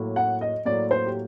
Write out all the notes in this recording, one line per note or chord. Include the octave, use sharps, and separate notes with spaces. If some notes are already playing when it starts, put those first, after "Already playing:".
Already playing: A2 F#3 A#3
F#5
D#5
A2 F#3 A#3 D5
C5
G4